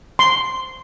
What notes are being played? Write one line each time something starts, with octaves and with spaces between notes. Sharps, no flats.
C6